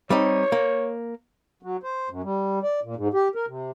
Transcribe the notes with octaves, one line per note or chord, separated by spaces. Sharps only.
G3 C4 D#4 C#5
A#3
F#3
C5
F#2
G3
D5
A#2
G#2
G4
A#4
C3